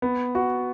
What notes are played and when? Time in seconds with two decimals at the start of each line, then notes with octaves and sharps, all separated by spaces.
0.02 B3
0.35 F#4